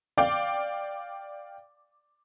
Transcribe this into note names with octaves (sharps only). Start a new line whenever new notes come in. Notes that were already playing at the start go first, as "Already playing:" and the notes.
D5 F5 G5 D6